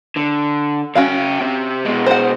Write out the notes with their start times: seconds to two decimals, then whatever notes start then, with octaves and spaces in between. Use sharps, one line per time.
0.17 D3
0.96 C#3 C#4 F#4 F5 G5
1.41 C3
1.86 B2 G#3
2.07 C5 F#5